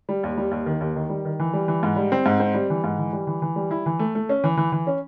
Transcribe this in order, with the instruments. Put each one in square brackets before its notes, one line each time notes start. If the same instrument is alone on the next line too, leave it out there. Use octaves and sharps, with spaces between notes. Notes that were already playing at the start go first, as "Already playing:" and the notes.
[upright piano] G3
D#2
G3
D#2
D#3
D#2
D#3
G3
D#3
E3
G3
E3
G#2
G3
C4
G#2
C4
G3
E3
G#2
E3
G3
E3
E3
G3
E4
E3
A3
A3
C#4
E3
E3
E3
C#4